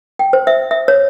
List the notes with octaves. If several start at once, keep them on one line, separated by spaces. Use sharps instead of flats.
G5
C5
E5
E5
C#5